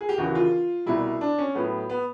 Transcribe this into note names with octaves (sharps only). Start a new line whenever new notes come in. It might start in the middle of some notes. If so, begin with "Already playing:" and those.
G#4
G4
D#2 C#3 E3 F#4
F4
C2 B2 G3 E4
D4
C#4
A2 F#3 B3
B3